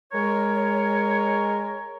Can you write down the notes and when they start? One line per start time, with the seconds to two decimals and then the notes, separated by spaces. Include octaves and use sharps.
0.12 G#3 A#4 C#5